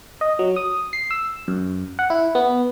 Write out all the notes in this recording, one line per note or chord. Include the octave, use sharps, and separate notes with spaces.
D#5
F#3
D#6
C7
E6
F#2
F#5
E4
B3